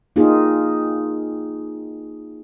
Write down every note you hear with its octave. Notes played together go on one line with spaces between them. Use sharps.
A#3 D#4 F4 G4 G#4